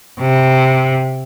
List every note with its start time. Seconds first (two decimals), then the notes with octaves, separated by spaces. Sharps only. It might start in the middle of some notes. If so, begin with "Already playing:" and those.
0.20 C3